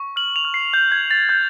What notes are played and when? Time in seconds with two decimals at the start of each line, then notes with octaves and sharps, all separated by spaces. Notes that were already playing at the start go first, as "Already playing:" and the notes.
Already playing: C#6
0.16 F6 F#7
0.36 F7
0.45 F6
0.54 C7
0.74 C#6 G6
0.92 G#6
1.01 G6
1.11 A6
1.29 F#6 G6